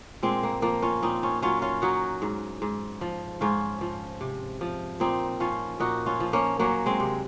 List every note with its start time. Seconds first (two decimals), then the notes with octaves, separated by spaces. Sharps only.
0.23 A#2 G#3 C4
0.43 A#3
0.62 F3 A#3
0.82 C#4 F4
1.03 A#2 C4 D#4
1.23 C#4 F4
1.42 F#3 C#4 F4
1.62 C#4 F4
1.82 F#3 D#4 F#4
2.22 G#2
2.62 G#2
3.01 F3
3.41 G#2 C#4 F4
3.81 F3
4.21 C3
4.61 F3
5.00 A#2 C4 D#4
5.40 F3 C#4 F4
5.80 A#2 D#4 F#4
6.06 C#4 F4
6.20 F3
6.33 A#3 C#4
6.59 F#3 A#3 C#4
6.86 G#3 C4
7.00 C3